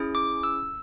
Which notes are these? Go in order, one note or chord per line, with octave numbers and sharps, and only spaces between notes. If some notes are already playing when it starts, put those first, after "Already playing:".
Already playing: C#4 E4 G#4
D6
E6